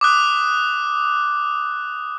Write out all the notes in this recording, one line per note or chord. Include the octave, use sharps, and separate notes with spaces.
D6 D#6 F#6